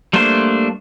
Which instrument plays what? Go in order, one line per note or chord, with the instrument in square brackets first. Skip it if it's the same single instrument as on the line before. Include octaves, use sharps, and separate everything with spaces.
[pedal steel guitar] G3 A3 A#3 D4 C5